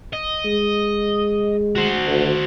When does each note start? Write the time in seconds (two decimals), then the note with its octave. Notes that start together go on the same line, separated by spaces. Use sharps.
0.13 D#5
0.45 G#3
1.75 F#4 C5
2.06 D2